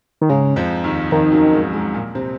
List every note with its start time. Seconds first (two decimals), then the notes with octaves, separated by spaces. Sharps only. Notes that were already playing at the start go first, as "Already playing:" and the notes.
0.21 D#3
0.29 G#2 C#3 G#3
0.56 F2 F3
0.84 D#2 D#3
1.11 F2 D#3 F3
1.32 F#2 F#3
1.53 G#2 G#3
1.73 G#2 G#3
1.94 A#2 A#3
2.15 C3 C4